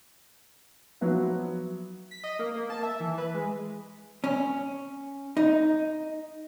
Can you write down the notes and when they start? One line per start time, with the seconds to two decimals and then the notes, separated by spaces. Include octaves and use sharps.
1.01 F3 F#3 B3 B4 E5
2.11 B6
2.24 D#5
2.39 A#3
2.56 A#3
2.70 A5
2.83 E5
3.00 E3
3.18 B4
3.34 G#3
4.24 C#4
5.37 D#4